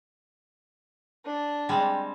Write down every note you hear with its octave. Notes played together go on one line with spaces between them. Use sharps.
D4
G3 G#3 C4